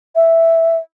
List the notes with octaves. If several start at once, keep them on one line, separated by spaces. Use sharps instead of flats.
E5